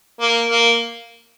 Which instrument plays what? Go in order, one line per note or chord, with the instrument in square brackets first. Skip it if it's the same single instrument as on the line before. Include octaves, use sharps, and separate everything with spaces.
[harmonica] A#3
A#3